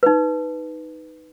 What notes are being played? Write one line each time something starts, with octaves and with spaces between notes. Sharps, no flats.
D#4 B4